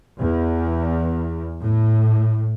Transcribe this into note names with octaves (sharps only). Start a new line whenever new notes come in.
E2
A2